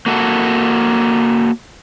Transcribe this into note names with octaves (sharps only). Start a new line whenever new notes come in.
A#3 F#4 A4